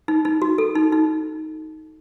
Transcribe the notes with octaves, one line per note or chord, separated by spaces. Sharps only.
D#4
D#4
F#4
A4
D#4
D#4